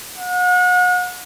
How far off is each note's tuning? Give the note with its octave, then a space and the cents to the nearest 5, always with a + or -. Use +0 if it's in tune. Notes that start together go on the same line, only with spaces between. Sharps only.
F#5 -40